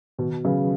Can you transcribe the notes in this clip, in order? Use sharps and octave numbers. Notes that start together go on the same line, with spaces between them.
B2 D#3
C#3 F#3 C#4 G#4 B4